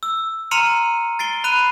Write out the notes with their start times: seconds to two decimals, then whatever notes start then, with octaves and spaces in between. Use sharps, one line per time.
0.03 E6
0.51 A#5 C6 F6 C#7 D#7 F7
1.19 A6 C7 D7 G7
1.44 B5 F#6 C7 D#7